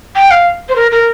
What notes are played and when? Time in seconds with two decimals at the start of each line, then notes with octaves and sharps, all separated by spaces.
0.16 G5
0.31 F5
0.69 C5
0.76 A#4
0.91 A#4